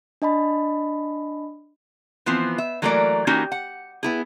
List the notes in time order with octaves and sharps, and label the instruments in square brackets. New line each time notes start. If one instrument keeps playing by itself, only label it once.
[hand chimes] D4 D#5 A5 B5
[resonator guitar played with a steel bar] E3 F3 B3 C4
E5
E3 F#3 A3 A#3 A#4 D5
E3 A#3 C#4 D#4 F#4 G4
F#5
B3 E4 G#4